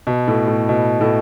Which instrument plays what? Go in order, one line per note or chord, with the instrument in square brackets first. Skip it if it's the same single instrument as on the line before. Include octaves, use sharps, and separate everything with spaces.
[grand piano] B2
A2
A2
B2
A2